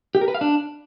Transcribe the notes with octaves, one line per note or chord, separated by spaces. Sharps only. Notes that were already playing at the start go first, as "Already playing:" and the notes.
G4
A#4
B4
F5
D4